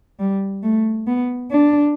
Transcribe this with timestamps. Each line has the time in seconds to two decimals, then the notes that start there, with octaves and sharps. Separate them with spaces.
0.20 G3
0.63 A3
1.07 B3
1.51 D4